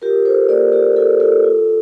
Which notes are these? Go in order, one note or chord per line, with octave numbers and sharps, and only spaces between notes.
F4 G4 A#4
F4 A4 C5
A#3 A#4 D5
A#3 G4 A#4
F4 A4
F4 A4
F4